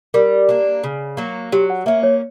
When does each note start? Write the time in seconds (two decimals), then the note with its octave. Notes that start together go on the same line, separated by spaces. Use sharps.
0.14 G3 A#4
0.49 A#3 D4
0.84 C#3
1.17 F#3 A#3
1.52 F#3 G4
1.70 F#5
1.86 A#3 C#4 E5
2.03 C#5